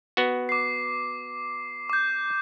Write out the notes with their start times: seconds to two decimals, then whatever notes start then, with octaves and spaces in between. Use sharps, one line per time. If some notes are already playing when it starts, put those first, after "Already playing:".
0.17 B3 F#4
0.49 D6 C7
1.90 D6 G6